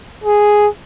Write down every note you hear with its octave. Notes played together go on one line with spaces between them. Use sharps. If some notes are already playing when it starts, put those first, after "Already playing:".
G#4